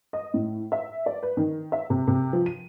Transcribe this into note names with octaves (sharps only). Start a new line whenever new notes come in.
D#5
A2
E5
D5
B4
D#3
E5
C3
C3
F3
D#7